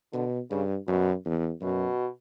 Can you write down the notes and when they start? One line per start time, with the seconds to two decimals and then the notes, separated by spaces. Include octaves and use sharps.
0.13 B2 D3
0.51 G2 C#3
0.88 F#2 B2
1.25 E2
1.61 F#2 B2